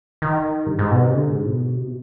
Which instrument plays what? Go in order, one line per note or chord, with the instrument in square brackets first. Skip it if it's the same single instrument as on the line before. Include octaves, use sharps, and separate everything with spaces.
[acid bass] D#3
G2
G#2
B2
C3
D3
G#2
B2
C3
B2